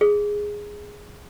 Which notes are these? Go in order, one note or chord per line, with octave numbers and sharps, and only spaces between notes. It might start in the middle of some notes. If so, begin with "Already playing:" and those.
G#4